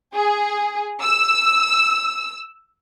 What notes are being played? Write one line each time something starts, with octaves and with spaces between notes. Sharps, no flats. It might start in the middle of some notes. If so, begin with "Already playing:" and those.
G#4
E6